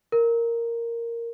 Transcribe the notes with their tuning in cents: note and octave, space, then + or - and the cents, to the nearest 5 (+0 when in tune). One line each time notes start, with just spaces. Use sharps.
A#4 -5